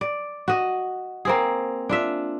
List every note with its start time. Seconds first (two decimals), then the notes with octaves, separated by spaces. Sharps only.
0.01 D5
0.48 F#4 D#5
1.25 A#3 C4 G#4
1.89 D4 F4 E5